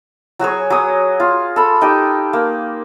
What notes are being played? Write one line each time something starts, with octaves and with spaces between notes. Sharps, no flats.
F#3 F#4 G#4 C#5
F#3 D#6
F4
A4 B5
D#4 G4 D#5 G5
A#3